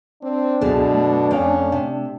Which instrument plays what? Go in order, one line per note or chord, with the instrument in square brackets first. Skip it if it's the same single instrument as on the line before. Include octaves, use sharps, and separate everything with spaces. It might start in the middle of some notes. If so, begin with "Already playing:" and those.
[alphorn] C4 [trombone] D4
[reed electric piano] C#2 B3 G#4 [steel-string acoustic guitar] F#2 D3 A5 [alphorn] B2
[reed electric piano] A3
[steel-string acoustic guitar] F2 F5 [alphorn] C#4
[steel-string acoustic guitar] C3